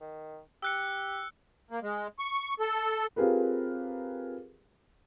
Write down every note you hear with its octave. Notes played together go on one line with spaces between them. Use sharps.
D#3
G4 E6 F#6 C#7
A#3
G#3
C#6
A4
C4 F4 G4 G#4 A#4 B4